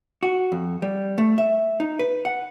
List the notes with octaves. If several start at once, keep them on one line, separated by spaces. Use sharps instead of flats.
F#4
F2
G3
A3
E5
D#4
B4
F#5